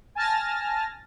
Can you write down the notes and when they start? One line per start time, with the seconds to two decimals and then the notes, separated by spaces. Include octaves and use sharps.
0.15 G#5 A5 F6 A6 A#6